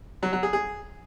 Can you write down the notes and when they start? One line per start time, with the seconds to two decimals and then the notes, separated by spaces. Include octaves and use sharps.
0.23 F#3
0.33 F#3
0.43 G#4
0.53 G#4